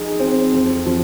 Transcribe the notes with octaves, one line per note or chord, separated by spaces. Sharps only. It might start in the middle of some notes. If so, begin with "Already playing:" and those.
Already playing: F3 D#4 G#4
C4
F2
F3